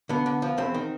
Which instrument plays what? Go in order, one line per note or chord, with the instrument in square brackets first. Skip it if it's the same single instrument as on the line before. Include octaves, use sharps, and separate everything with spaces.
[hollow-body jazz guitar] D3 B3
D3
F3
E2 C4
D#3